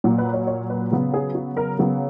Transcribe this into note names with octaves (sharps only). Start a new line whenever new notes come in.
A#2 F#3 A#3
B4
C#5
C#5
B4
C#3 F#3 B3
G#4
F#4
A#4
C#3 F#3 B3